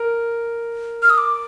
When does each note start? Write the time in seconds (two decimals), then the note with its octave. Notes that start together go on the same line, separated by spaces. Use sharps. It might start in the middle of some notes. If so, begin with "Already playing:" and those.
Already playing: A#4
1.02 F6
1.10 D#6
1.18 D6